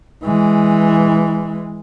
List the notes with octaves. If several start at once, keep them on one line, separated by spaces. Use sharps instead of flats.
E3 G#3